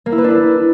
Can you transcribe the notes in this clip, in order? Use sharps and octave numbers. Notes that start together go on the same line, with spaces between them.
A#3
E4
B4
D4
E4